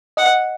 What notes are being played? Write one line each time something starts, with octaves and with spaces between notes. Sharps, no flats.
D#5 F#5